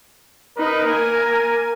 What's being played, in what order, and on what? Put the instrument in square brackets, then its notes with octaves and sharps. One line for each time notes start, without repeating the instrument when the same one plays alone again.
[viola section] D#4 B4 [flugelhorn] A#4
[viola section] A#3 G#5